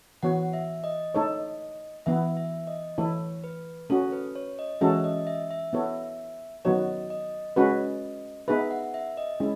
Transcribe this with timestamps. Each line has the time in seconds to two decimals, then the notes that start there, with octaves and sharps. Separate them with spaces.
0.23 E3 B3 F#4 C#5 F#5
0.53 E5
0.84 D#5
1.14 A3 D#4 A4 C#5
2.06 E3 B3 E4 E5
2.37 E5
2.67 D#5
2.98 E3 A3 E4 A4 C#5
3.44 B4
3.90 A3 C#4 F#4 A4
4.12 B4
4.35 C#5
4.59 D#5
4.81 E3 G#3 C#4 F#4 A4 E5
5.04 D#5
5.27 E5
5.51 E5
5.73 B3 E4 A4 C#5
6.65 D#3 F#3 B3 F#4 C#5 D#5
7.10 D#5
7.56 G#3 C#4 F#4 B4 D#5
8.48 B3 D#4 G#4 B4 E5
8.71 F#5
8.94 E5
9.17 D#5
9.40 G#3 C#4 E4